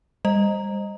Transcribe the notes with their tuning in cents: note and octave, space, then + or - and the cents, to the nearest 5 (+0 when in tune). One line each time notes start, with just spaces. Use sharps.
G3 +35 D#5 -5